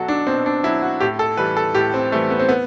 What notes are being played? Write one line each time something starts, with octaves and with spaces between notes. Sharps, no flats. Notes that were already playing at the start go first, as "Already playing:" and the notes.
Already playing: B2 F#3 F#4 A4
D4
B2 C4
D4
F#3 E4
F#4
A2 G4
A4
E3 G3 B4
A4
A2 G4
C4
E3 G3 A3
B3
C4
B3